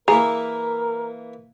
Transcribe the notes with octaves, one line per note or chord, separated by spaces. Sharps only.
E3 A#3 E4 G#4 A#4 A#5